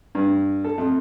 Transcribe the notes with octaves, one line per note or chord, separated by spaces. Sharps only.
G2
A4
F2